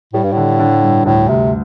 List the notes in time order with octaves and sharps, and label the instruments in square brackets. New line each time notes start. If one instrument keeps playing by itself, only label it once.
[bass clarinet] A2 [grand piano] G3
[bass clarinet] G2
[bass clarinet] A2 [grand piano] D3
[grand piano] D3
G2
[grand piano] D2 [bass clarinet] A2
[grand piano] D2 [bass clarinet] C3